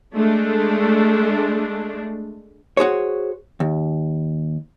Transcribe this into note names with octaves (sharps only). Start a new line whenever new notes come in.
G#3 A3 D4
F#4 G#4 C5 C#5
D#2